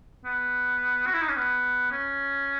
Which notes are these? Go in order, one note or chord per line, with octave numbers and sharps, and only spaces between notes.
B3
F#4
E4
D#4
C#4
B3
C#4